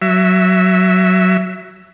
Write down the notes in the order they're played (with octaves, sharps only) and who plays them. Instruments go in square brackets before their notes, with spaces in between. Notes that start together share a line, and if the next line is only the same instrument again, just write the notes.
[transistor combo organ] F#3 E5